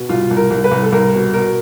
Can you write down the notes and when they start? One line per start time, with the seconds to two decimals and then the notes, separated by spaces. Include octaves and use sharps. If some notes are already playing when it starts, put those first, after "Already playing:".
Already playing: B2
0.09 C2 F4
0.31 C2
0.37 A#4
0.50 C2
0.64 B4
0.71 C2
0.83 A4
0.92 C2 A#4
1.13 B2
1.33 B2 A#4